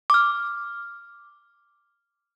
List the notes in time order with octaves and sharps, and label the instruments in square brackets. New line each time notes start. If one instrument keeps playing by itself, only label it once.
[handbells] D6 F6